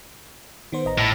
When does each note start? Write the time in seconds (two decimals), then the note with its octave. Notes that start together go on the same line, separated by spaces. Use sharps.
0.72 D#3 B3 C5
0.85 A1 D#5 A#5
0.98 A2